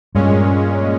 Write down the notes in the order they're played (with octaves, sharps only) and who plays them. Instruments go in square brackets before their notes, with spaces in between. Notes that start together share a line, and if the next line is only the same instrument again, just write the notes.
[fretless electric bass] G2 [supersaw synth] A#2 G#3 C#4